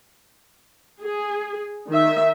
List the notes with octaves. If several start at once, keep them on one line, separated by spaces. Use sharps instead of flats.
G#4
D#3 E5